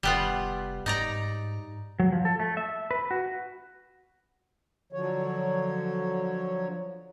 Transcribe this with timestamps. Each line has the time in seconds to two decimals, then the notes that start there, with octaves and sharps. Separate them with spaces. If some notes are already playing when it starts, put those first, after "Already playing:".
0.03 F1 G3 B3 F4
0.86 G#2 D#4 D5 A#5
2.00 F#3
2.12 F3
2.25 A4
2.40 A3
2.57 E5
2.91 B4
3.11 F#4
4.93 D3 F3 F#3 C#5